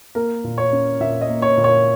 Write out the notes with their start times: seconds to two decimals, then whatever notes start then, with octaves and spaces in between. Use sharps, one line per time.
0.15 A#3 A#4
0.44 A#2
0.58 C#5
0.72 C#4
1.00 A#2 E5
1.21 D#5
1.29 A#3
1.42 C#5
1.57 A#2
1.64 C#5